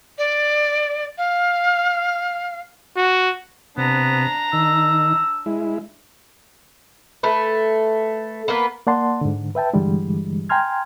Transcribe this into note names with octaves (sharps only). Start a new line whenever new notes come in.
D5
F5
F#4
C3 B3 D4 A#5
D#3 E6
G#3 E4
A3 B4
A#3 B3 B4
A#3 D5 F#5 A5 C6
G#2 D3
B4 E5 G5 A5
G2 D3 E3 G3 G#3
G5 G#5 A#5 C6 F6 G#6